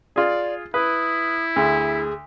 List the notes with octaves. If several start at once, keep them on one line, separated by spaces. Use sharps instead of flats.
F4 G#4 D5
E4 B4 D#6
D2 G#4